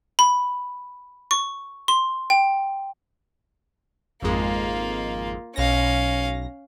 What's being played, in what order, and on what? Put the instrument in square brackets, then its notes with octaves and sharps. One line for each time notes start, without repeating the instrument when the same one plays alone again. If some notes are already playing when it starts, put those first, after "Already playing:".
[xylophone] B5
C#6
C6
G5
[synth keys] G#1 F2 G#3 [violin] A#3 F4
[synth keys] B1 A#6 [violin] C#4 F5